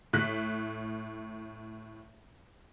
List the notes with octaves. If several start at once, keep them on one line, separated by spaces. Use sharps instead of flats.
A2 F#6 B6